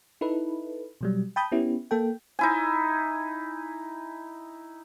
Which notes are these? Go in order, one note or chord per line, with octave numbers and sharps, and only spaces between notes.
D#4 E4 A4 B4
B2 F#3 G3
G5 A5 B5 D#6 G6
B3 C#4 E4 G4
A#3 A4 G5
D#4 E4 G#5